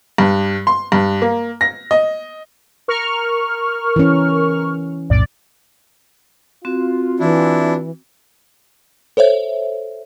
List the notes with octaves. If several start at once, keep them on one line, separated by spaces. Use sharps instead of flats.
G2
C6
G2
A#3
A#6
D#5
A#4 C#6 F6
E3 C#4
B1 F2 A2 D5
C4 F4 F#4
E3 D4 E4
A4 C5 C#5 E5